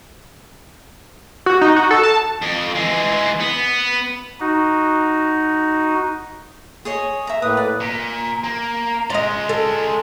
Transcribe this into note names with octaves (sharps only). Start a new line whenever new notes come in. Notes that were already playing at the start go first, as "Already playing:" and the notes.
F#4
D#4
F#4
A4
A5
F2
E3 G#3
B3
D#4 F#4
G#4 C#5 D#5
E5 A#5
A2 A#3 B4 D#6
D5
A#2
A#3
G#3 F4 D5 D#5
A4